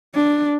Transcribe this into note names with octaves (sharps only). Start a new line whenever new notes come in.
D4